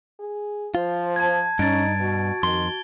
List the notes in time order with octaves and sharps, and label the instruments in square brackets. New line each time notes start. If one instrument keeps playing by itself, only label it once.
[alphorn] G#4
[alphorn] F3 [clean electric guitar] F4 [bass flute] C5
[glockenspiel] A5 G#6
[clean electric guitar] G2 [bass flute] C#4 [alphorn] D#4 [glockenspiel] A6 D7
[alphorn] B2 [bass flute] F#4
[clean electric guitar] F2 C6 [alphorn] D#3 [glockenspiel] G7